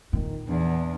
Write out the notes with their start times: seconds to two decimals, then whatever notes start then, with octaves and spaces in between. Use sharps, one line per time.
0.13 A#2 D#3
0.48 E2 D4